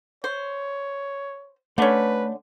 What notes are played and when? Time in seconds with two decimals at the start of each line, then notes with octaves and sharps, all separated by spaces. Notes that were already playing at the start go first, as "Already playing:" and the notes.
0.24 C5 C#5
1.78 D3 A3 C#4 B4